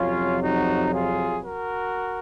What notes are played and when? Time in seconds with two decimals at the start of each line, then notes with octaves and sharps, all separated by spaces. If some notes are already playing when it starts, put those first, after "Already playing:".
Already playing: F2 C3 F#3 C#4 F4
0.41 D#4 F#4
0.92 F4 G#4
1.43 F#4 A#4